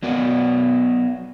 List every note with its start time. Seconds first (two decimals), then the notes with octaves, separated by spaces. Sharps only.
0.03 F#3 B3 F#4 D5